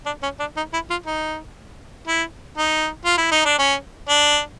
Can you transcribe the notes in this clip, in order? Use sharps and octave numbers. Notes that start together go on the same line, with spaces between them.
D4
C#4
D4
D#4
E4
F4
D#4
E4
D#4
F4
E4
D#4
D4
C#4
D4